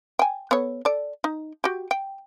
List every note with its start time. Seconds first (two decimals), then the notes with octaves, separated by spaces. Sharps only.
0.19 G5 G#5
0.51 B3 A4 C#5
0.85 A4 D5
1.24 D#4
1.64 F#4 G4
1.91 G5